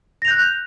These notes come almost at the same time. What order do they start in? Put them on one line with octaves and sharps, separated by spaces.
A#6 F7 G6 F#6